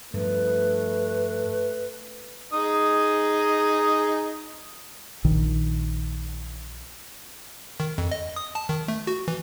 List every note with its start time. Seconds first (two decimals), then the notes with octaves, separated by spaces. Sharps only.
0.14 G2 F3 A3 B4
2.53 D#4 G#4 D#6
5.24 A#1 D#3
7.80 D#3
7.98 F2
8.11 D#5
8.36 D#6
8.55 A5
8.69 D#3
8.88 A3
9.07 F#4
9.28 E3